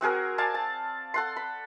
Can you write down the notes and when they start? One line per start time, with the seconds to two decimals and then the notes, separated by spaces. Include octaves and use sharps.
0.01 C4 F#4 G#4 A#4
0.38 D5 F5 G#5 A5
0.54 A5
1.14 A4 F#5 C6
1.36 B5